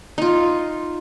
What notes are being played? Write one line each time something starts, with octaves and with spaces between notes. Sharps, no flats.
D#4 F4